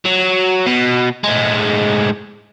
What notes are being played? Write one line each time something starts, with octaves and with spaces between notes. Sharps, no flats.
F#3
B2
A2 G#3